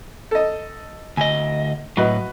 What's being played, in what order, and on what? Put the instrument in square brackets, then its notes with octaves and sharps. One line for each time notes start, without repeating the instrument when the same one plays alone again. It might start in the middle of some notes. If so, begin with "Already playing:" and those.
[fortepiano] A4 D#5
[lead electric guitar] D2 D#5 [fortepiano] G#5
[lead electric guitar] A2 F#3 [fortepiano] F#4 B4 D#5